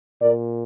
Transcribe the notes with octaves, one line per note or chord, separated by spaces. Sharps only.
A#2 A#4 D5